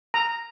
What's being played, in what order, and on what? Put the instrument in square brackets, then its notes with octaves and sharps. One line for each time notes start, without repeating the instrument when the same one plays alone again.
[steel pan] A#5